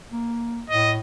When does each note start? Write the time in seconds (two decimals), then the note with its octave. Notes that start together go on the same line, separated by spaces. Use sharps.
0.12 A#3
0.70 A2 D#5